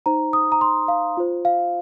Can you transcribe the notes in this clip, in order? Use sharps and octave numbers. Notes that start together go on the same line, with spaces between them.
D#4 C5 A#5
D#6
A#5
C6
F5
F4 C5
F5